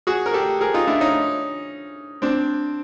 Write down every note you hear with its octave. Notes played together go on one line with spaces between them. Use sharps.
F#4 G#4
A#4
G4 A4
G#4 A#4
D#4 F4
D4 E4
C#4 D#4
C4 D4